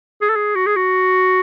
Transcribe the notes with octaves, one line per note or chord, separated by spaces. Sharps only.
G#4
A4
G#4
F#4
G#4
F#4